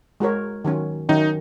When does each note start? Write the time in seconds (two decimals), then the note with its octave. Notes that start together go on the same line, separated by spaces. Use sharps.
0.20 G#3 F#4 A#4 C#5
0.65 D#3 F#3 C#4
1.09 D#3 F#3 C#4 D#4